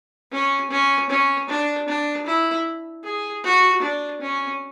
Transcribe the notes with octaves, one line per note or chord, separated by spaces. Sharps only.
C#4
C#4
C#4
D4
D4
E4
G#4
F#4
D4
C#4